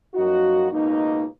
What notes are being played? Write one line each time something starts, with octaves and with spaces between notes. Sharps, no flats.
F#2 F3 A#3 D#4 F#4
C#2 B2 A#3 D#4